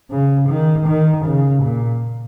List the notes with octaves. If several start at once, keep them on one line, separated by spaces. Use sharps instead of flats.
C#3
D#3
D#3
C#3
A#2